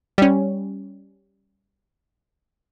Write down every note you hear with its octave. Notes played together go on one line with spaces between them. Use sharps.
G3 C#4